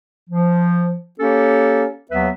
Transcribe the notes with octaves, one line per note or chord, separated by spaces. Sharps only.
F3
A#3 C#4 G4 A4 C#5
D#2 F#3 B3 B4 E5